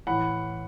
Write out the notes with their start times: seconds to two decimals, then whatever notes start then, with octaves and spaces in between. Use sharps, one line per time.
0.07 A2 E3 F#5 B5